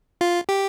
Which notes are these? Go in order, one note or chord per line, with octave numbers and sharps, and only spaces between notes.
F4
G4